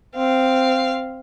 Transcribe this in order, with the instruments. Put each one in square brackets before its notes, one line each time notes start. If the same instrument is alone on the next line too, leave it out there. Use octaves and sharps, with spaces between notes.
[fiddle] C4 F5